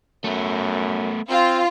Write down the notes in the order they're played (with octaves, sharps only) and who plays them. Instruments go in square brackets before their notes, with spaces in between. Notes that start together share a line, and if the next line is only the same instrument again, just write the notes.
[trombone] F#2 [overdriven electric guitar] A3 B3
[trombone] C4 [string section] F4